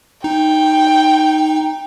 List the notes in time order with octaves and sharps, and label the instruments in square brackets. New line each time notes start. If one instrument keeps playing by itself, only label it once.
[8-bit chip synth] D#4 [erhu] G5